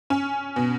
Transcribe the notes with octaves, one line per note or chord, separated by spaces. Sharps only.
C#4
B2